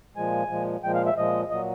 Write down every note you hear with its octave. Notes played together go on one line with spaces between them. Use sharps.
A#2 F3 G#3 G#5
A#2 F3 G#3
A#2 F3 G#3 G5
F5
E5
A#2 F3 G#3 D#5
A#2 F#3 D#5